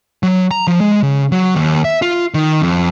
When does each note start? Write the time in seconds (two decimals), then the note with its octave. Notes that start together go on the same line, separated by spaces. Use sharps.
0.23 F#3
0.51 A#5
0.67 F3
0.81 G#3
1.03 C#3
1.32 F#3
1.55 D#2
1.85 E5
2.02 F4
2.34 D#3
2.62 F2